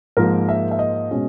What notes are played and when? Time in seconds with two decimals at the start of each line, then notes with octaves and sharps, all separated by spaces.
0.17 G#2 F3 A#3 A#4
0.49 E5
0.71 E5
0.79 D#5
1.11 B2 G#3 C#4